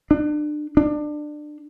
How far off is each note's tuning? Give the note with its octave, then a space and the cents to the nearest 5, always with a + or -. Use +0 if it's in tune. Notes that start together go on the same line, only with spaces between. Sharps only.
D4 +30
D4 +25